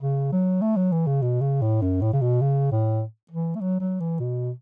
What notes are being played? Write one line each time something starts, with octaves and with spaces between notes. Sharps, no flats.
C#3
F#3
A3
F#3
E3
C#3
B2
C#3
A2
F#2
A2
C#3
B2
C#3
A2
E3
A3
F#3
F#3
E3
B2